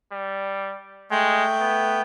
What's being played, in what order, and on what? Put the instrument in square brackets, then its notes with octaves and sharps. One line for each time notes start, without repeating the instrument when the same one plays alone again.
[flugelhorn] G3
[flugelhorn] G#3 [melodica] A3 G5
[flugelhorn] B3